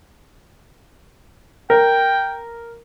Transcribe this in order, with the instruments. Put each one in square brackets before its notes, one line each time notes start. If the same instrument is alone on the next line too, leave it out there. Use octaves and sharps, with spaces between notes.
[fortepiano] A#4 [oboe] G5